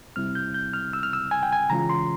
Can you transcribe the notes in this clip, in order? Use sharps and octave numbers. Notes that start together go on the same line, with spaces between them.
C3 G3 C4 E4 F6
G6
G6
F6
E6
F6
E6
G#5
G5
G#5
C#3 E3 G#3 C#4 F4 A#5
C6